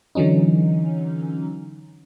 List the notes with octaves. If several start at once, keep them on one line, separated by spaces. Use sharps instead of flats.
D3 E3 F#3 C#4 D#4